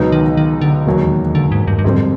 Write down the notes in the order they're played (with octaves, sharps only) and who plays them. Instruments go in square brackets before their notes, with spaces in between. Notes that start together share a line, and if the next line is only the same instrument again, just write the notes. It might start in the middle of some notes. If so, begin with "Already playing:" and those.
Already playing: [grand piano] C#2 B2 F#3 B3 D#4
[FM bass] D#3
D#3
D3
[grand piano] E1 D#2 D#3 F#3
[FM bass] D3
G#2
G2
G2
[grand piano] F2 D3 G3 C4 [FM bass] G#2